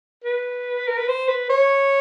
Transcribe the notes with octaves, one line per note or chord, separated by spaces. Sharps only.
B4
A#4
B4
C5
B4
C#5